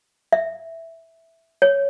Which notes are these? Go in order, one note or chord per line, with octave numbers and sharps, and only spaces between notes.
E5
C#5